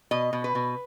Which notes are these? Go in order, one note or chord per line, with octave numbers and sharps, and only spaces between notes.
B2 D#5
B2
B4
B2